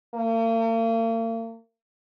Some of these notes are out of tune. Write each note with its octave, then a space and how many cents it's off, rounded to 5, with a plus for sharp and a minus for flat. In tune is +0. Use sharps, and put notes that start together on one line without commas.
A#3 -45